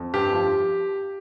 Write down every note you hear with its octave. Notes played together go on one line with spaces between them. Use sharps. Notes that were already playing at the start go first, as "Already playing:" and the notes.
Already playing: F2
G2 G4
F3